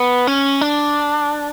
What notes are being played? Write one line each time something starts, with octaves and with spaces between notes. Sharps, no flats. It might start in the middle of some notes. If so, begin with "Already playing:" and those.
Already playing: B3
C#4
D4